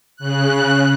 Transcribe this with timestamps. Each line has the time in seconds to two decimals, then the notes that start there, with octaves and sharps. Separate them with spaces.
0.16 C#3 F#6